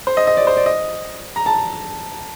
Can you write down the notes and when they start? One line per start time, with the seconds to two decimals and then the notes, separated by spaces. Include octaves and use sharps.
0.07 C5
0.17 D#5
0.27 D#5
0.37 D5
0.47 C5
0.57 D5
0.66 D#5
1.36 A#5
1.46 A5